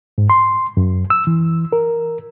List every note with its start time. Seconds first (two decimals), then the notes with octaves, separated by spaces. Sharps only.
0.18 G#2
0.30 C6
0.77 F#2
1.10 E6
1.27 E3
1.72 A#4